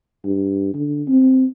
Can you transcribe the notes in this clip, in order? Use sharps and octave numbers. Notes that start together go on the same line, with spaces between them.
G2
D3
C4